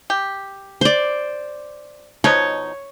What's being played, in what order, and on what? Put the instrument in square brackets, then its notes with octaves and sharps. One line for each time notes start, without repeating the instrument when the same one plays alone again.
[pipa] G4
[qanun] C5 D5
[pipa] B2 F3 D#4 [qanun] C#5